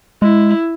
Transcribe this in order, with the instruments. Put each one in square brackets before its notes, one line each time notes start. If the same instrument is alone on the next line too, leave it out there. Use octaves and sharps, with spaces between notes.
[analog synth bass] G#3 [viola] E4